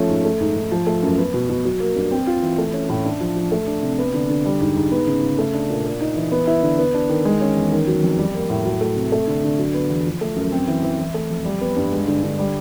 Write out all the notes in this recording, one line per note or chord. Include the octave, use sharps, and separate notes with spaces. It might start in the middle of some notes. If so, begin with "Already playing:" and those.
Already playing: F3 A3 C#4
G#2
A3
G#2
G#2
F3
A3
F#2
B3
B2
B2
F#3
A#3
G2
C4
F4
E3
A3
C#4
A2
D4
F3
F3
A3
D4
C3
B3
D3
D3
G3
G#2
G#2
B3
C#3
C#3
A3
D4
A#2
A#3
D#4
E3
B3
E4
D3
B3
D4
D#3
G#3
C#4
E2
D#3
F#3
F2
G3
A#3
A2
F#3
A3
C3
A3
D3
D3
F#3
B3
E2
F3
A3
F#2
C4
E3
E3
E3
A3
F2
G3
B3
G2
G#3
D3
D3
G3